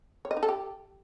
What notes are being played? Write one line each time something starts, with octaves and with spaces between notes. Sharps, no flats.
C#5
D#5
D#4
A4
G4